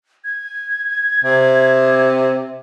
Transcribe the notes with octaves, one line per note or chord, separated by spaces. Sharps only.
G#6
C3